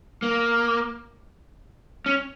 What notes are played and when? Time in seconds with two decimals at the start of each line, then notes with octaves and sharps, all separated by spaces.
0.22 A#3
2.06 C#4